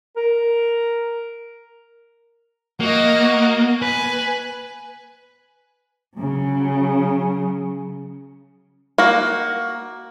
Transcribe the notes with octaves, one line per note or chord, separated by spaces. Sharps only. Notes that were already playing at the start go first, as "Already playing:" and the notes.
A#4
A#3 F#4 D#5
B4 G#5
C#3 F#3
A#3 F#4